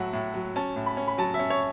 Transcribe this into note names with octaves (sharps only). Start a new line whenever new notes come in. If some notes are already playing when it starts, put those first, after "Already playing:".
Already playing: A2 F#3 E5 F#5 A5
A2
F#3
C#4 A5
A2
B5
C#4
B5
F#3 A5
E5
C#4
C#5